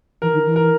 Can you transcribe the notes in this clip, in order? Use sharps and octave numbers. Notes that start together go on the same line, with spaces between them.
E3 A#4
D#3
E3
A#4